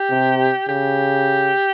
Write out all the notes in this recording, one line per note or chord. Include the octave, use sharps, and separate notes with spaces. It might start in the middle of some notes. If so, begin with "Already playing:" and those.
Already playing: G4
C3
C#3 G4